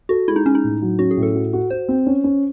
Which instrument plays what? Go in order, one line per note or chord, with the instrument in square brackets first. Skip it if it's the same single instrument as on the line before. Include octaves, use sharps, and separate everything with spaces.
[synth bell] F#4 [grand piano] A4
[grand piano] G#3 [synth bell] E4
[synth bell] D#4
[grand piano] G#3 [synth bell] C#4
[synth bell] D#4
[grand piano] A2
F#3
[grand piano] C#4 [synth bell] F#4
[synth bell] G#4
[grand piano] A2
[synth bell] A4
[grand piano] F#4
F#4
[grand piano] F#4 [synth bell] C5
[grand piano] C4
C#4
C#4